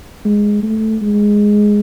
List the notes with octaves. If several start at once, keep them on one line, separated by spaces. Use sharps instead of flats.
G#3
A3
G#3